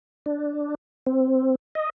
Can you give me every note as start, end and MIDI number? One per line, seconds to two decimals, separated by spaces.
0.26 0.75 62
1.07 1.55 60
1.75 1.90 75